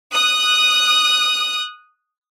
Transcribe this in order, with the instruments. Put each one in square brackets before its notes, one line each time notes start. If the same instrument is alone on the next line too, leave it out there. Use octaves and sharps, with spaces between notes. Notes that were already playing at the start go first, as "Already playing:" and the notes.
[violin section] D#6 F#6